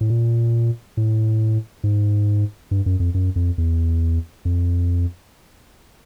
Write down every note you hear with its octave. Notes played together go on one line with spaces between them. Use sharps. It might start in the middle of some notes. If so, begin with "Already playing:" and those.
A2
A#2
A2
G#2
G2
F#2
F2
F#2
F2
E2
F2